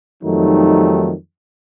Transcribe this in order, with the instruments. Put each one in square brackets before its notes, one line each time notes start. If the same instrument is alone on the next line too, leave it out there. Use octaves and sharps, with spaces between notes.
[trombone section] F2 D#3 F#3 G3 A3 D#4